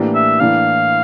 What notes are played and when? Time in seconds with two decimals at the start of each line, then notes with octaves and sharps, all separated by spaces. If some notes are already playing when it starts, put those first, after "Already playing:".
Already playing: A2 E3 A#3 D4 G4
0.15 E5
0.40 A2 E3 A#3 D4 F5